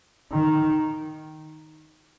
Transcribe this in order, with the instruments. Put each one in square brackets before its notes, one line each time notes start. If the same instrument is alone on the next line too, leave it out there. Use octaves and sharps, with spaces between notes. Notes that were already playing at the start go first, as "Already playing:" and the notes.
[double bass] D#3